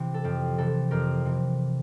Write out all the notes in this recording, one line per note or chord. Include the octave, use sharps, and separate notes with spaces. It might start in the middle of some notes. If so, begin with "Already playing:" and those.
Already playing: C3 E3
A4
F2 G4
C3 E3 A4
F2 G4 A#4
C3 E3